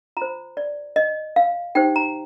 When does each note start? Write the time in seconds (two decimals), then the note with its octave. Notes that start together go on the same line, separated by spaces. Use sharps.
0.17 F4 C5 A#5
0.57 D5
0.96 D#5
1.36 F5
1.75 D#4 G4 C5 G5
1.96 A#5